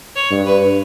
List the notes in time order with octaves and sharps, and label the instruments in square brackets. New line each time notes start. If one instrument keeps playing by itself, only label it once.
[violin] C#5
[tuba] G2
[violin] B4